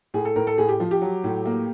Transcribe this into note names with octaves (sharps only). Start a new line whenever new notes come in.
A2 G#4
A4
A2 A#4
A4
A2 G#4
G4
F3
G4
F#3
A2
A#3